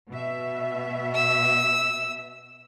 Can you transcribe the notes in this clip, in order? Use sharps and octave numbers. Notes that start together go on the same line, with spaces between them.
B2 E5
E6